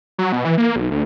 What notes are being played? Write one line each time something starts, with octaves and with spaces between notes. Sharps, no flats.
F#3
B2
E3
A#3
B1
D2